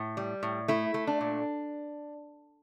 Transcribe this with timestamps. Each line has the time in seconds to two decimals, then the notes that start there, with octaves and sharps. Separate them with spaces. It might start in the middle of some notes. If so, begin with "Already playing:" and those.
Already playing: A2
0.17 G3
0.43 A2
0.68 A3 E4
0.94 A3
1.07 D4
1.21 A#2